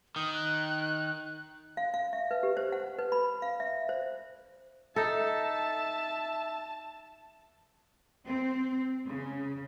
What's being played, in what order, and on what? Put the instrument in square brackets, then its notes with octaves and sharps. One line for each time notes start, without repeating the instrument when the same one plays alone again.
[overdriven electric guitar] D#3 [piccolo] D#6
[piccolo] F#6
[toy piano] F5
F5
E5
B4
G4
C5
F#5
B4
B5
F5
E5
C5
[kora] D#4 A4 [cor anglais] E5 [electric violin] A5
[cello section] C4
C#3